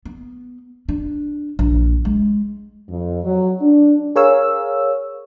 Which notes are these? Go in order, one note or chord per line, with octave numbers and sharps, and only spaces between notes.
B3
D4
A#1
G#3
F2
F#3
D4
G#4 A#4 C#5 F5 E6